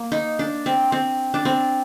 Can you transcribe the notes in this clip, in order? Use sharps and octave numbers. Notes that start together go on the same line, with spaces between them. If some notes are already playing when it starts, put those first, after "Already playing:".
Already playing: A#3
D#4
D4
C4
C4
D4
C4